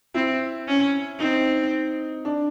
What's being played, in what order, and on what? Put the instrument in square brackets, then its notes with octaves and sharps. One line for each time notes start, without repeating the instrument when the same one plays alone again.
[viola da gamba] C4 [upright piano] E4
[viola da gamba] C#4
[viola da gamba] C4 [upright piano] D#4
[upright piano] D4